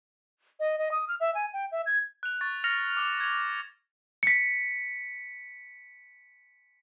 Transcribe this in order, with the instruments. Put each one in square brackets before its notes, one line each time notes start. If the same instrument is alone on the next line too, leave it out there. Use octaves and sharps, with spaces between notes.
[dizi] D#5
D#5
D#6
F6
E5
G#5
G5
E5
G#6
[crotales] F#6 F7
C#6 A6
F6 A#6 C#7 F7
D6 F6
G#6 F7
[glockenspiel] B6 C#7